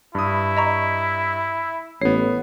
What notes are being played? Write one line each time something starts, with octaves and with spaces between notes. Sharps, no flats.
G2 E4 D#6
D#5 A#5 C#6
A1 B3 C#5 C7